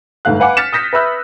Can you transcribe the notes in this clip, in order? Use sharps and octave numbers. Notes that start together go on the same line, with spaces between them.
G1 G#2 A3 F5 F#6
B4 F5 F#5 G#5 D6
F6 A6 B6 C#7 E7
D#6 G6 A#6 B6 C#7
B4 E5 B5 E6 F#6